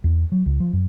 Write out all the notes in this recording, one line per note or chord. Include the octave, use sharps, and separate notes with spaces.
E2
F#3
C#2
F3
F#2